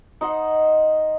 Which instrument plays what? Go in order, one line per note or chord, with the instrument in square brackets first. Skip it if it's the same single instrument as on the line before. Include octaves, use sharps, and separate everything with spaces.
[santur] D#4 C5 D#5 F#5